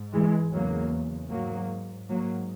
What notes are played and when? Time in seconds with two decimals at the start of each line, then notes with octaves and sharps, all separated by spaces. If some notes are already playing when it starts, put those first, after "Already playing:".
Already playing: G#2
0.13 E3 G#3
0.53 E2 C#3 F#3 A#3
1.31 G#2 F#3 A#3
2.09 G#2 F#3 A#3